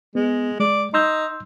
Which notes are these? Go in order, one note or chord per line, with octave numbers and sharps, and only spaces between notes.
G#3 B3
G#3 D5
D#4 C6 E6 G6